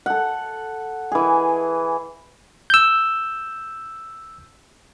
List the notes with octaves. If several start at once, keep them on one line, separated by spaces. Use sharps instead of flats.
A4 F#5
E3 G#4
E6 G6